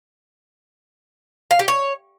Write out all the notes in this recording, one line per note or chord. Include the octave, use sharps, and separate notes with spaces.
F5
G4
C#5